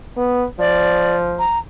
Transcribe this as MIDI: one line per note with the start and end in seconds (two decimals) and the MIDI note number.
0.17 0.45 59
0.59 1.45 53
0.59 1.17 74
1.39 1.59 82